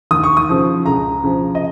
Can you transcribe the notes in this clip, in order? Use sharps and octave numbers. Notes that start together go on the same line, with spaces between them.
D#2 D#6
C#6
D#6
C#3 F3
C#2 A#5
C#3 F3
D#5